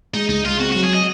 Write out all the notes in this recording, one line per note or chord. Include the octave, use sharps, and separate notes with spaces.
G#3 D#4
C#2 D#4
G#3 F4
C4 F#4
F#4
F#3
G#4
D#5